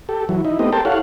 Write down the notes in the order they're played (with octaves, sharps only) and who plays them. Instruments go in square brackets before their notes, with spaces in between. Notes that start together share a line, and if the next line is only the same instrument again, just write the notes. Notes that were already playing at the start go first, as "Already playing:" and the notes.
[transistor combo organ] G4 A4
E3 F#3
D#4 E4
A3 B3 C4 G4 D#5
G4 A4 A#4 C5 G5 A5
E4 G4 A4 C#5 F5 F#5